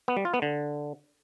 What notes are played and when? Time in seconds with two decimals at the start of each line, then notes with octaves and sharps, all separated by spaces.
0.08 B3
0.17 G3
0.25 F4
0.34 B3
0.42 D3